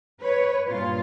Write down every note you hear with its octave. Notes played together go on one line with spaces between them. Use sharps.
B4 C#5
G2 A#2 F4